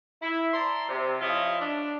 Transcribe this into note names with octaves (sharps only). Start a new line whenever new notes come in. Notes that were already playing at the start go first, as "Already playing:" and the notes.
E4
D5 A5 A#5 C6
C3
F3 E4 F4 C#5 D#5 E5
D4